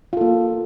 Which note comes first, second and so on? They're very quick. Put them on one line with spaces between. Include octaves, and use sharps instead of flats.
F4 A4 A#3